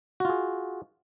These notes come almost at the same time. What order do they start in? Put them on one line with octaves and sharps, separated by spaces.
F#4 F4 G#4